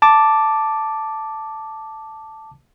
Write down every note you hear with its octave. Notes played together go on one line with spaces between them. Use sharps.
A5 D6